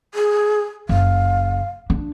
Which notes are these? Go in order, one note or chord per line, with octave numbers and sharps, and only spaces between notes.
G#4
F#1 F5
D4